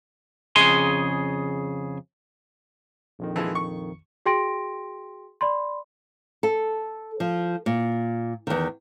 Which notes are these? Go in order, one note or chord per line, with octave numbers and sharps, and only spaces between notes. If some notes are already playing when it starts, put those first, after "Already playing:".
F2 C#3 G#4 G#5 C6
A#1 F2 D#3
E3 F3 G#3
C#6
F#4 G#4 G5 C6 A#6 D7
D5 B5 C6
A4
F3
A#2
E2 D#3